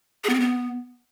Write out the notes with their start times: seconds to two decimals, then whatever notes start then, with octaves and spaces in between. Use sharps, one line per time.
0.24 G#4
0.29 B3
0.35 C4
0.40 B3